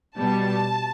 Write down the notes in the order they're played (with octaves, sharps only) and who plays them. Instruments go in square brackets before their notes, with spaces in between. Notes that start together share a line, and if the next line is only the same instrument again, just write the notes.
[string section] B2 G3 A5